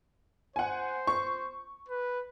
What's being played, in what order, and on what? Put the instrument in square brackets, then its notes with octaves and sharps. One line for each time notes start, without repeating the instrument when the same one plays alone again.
[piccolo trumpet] C5 [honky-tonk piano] F#5 G#5
[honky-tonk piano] C#6
[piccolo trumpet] B4